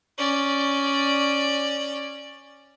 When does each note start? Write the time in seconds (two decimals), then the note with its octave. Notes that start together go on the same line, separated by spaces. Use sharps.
0.18 C#4 D5